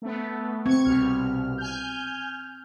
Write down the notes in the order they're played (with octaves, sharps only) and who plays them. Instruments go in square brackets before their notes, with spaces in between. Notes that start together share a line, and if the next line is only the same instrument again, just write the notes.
[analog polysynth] A3 B3
[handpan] C4 [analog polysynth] C#6 G#6
[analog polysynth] C2 B2 F6
G#5 F6 G6